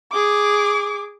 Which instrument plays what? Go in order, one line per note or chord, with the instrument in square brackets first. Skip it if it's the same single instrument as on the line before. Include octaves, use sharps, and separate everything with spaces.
[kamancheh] G#4 D6